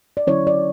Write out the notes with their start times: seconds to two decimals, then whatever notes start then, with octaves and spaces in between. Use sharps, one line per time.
0.17 D5
0.27 D3 F#3 C#4 E4 C#5
0.47 D5